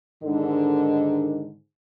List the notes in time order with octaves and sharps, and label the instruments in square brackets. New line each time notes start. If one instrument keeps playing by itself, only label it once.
[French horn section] G#2 D3 D#3